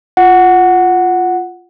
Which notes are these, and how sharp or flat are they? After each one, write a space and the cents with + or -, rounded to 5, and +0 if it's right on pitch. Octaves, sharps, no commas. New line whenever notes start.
F4 +0 F#5 +0